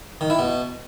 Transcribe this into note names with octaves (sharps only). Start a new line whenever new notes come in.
D#3
E4
B2